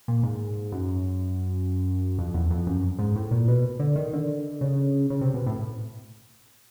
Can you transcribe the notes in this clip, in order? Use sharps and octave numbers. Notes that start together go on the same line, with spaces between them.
A#2
G#2
F#2
F2
E2
F2
F#2
G#2
A2
A#2
B2
D3
D#3
D3
C#3
C#3
C3
B2
A2